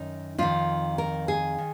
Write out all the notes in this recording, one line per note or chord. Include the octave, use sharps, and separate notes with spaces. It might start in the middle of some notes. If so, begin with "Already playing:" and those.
Already playing: F#2 D#3 D#4
F2 D#3 F4
A#4
G#4
D#3